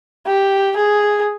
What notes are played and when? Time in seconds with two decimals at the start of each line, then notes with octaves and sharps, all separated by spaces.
0.26 G4
0.76 G#4